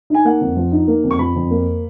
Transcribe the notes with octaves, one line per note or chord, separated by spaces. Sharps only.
D#4 G#5
A#3 F#5
F2
F3
D#4
A#3
F2
C#6
F3 B5
F2
A#3